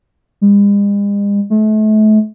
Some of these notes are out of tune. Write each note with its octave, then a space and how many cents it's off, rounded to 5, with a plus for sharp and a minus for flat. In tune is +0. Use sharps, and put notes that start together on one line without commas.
G#3 -45
A3 -35